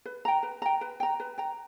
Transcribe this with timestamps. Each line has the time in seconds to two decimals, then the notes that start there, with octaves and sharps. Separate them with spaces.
0.05 B4
0.25 G5 A#5
0.43 B4
0.62 G5 A#5
0.81 B4
1.00 G5 A#5
1.20 B4
1.38 G5 A#5